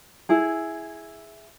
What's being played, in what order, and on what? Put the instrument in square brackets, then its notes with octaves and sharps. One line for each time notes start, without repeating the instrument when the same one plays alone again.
[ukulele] E4 G#4